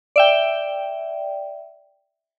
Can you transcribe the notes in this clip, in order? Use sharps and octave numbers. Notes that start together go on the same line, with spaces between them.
D5 E5 G5